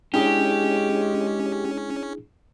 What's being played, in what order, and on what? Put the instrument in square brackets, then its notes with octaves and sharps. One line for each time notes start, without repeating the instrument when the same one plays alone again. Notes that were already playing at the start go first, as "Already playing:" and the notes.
[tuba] G#3 [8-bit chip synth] C#4 [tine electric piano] D4 E4 G#4 [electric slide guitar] G4